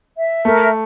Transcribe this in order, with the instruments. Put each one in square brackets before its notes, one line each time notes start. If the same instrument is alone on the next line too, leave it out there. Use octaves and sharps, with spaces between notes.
[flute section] E5
[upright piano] A3 [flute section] A#4